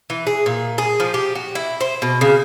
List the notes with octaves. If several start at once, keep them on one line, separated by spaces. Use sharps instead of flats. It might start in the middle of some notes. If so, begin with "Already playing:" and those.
E3
G#4
A#2
G#4
F3
G4
F#4
E4
C5
B2
C#3